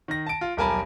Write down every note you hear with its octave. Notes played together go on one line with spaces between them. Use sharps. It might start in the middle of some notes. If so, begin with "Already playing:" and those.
D#3 A#6
A5 D7
F4
D#1 B1 A#4 G#5 A5 B5